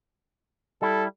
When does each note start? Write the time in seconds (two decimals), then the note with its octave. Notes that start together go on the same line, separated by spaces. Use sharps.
0.82 G3 E4 A4